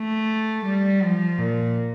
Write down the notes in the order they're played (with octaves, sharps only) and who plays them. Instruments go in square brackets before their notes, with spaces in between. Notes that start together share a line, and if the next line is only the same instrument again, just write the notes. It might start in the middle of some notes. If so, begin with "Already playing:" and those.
Already playing: [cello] A3
G3
F3
A#2